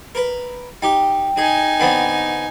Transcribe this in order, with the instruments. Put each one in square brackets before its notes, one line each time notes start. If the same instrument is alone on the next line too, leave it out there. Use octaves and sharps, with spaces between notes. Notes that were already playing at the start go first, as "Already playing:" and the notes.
[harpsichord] A#4 B4
[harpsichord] D#4 G4 [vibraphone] G5
[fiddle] D#4 G#5 [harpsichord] G#4
[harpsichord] D3 B3 C4